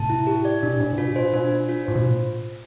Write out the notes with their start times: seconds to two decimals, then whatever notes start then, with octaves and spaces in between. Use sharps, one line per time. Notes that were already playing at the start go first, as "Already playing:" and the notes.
Already playing: A2 C3 A5
0.10 E4
0.27 G4
0.45 D5
0.63 B2 D4
0.80 A2 D4
0.93 C3
0.98 B2 F4
1.16 B2 C5
1.33 B2 D4
1.52 D4
1.69 F4
1.86 A2 C5
1.96 B2